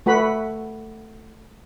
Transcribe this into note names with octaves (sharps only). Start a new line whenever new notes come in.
A3 F#4 B4 B5